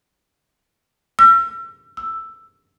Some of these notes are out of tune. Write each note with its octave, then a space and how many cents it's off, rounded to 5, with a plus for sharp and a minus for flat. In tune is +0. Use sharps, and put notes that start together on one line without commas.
E6 +35
E6 +5